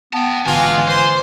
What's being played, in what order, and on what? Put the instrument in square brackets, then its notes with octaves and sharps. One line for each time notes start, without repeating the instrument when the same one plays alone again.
[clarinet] B3 [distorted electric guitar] G5 A5
[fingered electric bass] G#1 D3 [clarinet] E3 [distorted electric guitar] G#3 G#5 [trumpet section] F4
[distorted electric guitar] C5 [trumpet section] G#5 C6